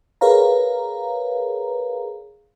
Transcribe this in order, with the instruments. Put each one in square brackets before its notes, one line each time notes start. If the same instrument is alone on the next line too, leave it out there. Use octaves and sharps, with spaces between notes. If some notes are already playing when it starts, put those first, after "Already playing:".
[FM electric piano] G#4 A#4 B4 C#5 F5 A#5